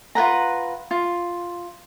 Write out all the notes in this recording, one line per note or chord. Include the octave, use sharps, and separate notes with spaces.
F4 B4 F#5 A#5
F4